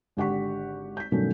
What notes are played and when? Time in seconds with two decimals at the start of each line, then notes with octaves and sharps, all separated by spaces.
0.17 G#1 D3 G4 F#5 C#6 B6
0.97 G6 B6
1.12 G2 B2 D#3 F#3 A3 C#4